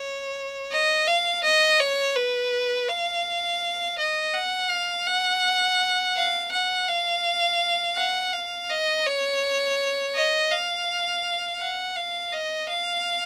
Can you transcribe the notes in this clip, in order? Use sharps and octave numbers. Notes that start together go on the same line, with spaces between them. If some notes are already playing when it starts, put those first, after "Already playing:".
Already playing: C#5
D#5
F5
D#5
C#5
B4
F5
D#5
F#5
F5
F#5
F5
F#5
F5
F#5
F5
D#5
C#5
D#5
F5
F#5
F5
D#5
F5